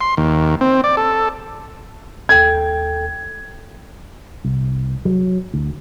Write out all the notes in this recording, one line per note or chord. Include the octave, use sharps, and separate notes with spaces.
C6
D#2
C4
D5
A4
D#2 A4 G5 G#6
C2
F#3
D2